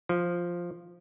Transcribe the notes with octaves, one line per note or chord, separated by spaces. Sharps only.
F3